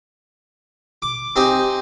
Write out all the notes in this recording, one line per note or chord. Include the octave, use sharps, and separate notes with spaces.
D6
C4 D#4 G4 G#5